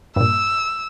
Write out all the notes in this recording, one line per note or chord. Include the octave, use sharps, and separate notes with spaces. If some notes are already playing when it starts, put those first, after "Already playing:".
G2 A#2 E6